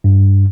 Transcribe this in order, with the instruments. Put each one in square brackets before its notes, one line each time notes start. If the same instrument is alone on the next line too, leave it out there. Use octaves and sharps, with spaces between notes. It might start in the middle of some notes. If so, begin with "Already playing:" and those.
[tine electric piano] G2